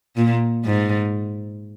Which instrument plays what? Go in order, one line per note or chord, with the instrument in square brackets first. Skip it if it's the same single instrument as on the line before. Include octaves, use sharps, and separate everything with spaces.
[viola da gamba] A#2
G#2